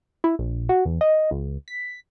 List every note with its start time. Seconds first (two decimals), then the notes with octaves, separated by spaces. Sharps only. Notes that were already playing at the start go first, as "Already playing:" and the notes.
0.24 E4
0.39 A#1
0.69 F#4
0.85 E2
1.01 D#5
1.31 C#2
1.68 B6